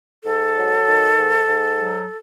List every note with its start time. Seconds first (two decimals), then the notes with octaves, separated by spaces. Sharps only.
0.25 G#2 A4
0.55 F#3
0.85 D#3
1.17 G#2
1.47 G#2
1.78 F#3